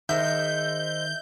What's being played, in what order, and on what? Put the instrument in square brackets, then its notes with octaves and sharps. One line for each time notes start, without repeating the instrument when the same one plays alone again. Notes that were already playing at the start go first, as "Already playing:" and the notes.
[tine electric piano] D#3 [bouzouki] G#3 D#4 C5 [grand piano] E5 [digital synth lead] G6